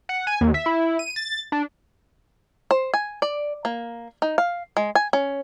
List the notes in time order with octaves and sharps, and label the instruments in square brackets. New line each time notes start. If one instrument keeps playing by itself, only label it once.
[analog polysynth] F#5
G#5
D#2
E5
E4
D#7
A6
D4
[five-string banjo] C5
G#5
D5
A#3
D#4
F5
G#3
G#5
C#4